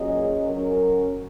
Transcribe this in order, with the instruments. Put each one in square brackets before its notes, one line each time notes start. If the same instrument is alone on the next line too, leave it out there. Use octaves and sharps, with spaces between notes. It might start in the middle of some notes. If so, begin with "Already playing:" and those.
Already playing: [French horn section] A#2 F#3 C#4 G#4 D#5
F#3 C#4 A#4